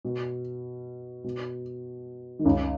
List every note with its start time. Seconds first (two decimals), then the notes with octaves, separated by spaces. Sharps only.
0.05 B2
1.24 B2
2.39 D#3
2.45 C#2 C#3